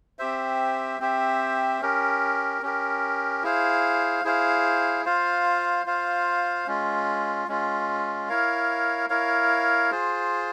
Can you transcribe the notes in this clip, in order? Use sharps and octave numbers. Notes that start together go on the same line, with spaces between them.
C4 G4 C5 E5
C4 G4 C5 E5
C#4 G4 A#4
C#4 G4 A#4
E4 G#4 C5 F5
E4 G#4 C5 F5
F4 C5 F5
F4 C5 F5
G#3 C#4 F4
G#3 C#4 F4
E4 A#4 C#5 F5
E4 A#4 C#5 F5
F4 G#4 C5